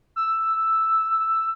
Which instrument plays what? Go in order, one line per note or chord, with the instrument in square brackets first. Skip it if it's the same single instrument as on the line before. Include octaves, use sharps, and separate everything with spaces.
[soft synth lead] E6